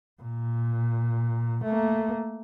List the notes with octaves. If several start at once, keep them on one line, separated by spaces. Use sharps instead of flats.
A#2
A3 A#3